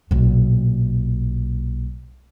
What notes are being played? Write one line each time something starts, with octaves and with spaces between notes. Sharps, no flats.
B1 A#2